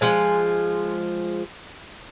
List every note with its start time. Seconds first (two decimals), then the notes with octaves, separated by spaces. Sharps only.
0.01 F3 G#3 G#5